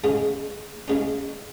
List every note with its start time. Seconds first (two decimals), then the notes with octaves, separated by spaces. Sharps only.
0.04 E2 C#3 G#3 C#4
0.88 E2 C#3 G#3 C#4